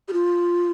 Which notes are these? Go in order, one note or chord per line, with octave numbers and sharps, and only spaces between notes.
G4
F4